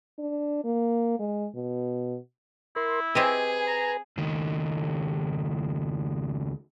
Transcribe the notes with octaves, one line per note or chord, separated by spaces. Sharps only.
D4
A#3
G#3
B2
E4 A#4 C6
C4 G4 G#4 B4 D#5 G#5
A#5
C#2 D#3